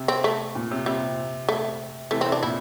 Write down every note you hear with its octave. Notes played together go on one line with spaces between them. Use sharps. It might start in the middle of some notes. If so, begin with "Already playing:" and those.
Already playing: C3
C4
A3
A#2
C3
C3 G3
A3
C3 E3 A3
C4
C3
D4
A#2 E4